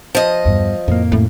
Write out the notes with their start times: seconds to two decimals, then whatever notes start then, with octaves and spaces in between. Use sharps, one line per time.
0.15 F3 D#5
0.45 E2 G2
0.88 F2 A2 A#3
1.12 A2 C#4